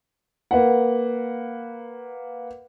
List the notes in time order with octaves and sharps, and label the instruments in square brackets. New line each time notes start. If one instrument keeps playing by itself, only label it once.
[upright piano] A#3 B4 F#5